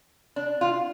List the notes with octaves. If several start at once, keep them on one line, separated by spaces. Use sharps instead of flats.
D4
F4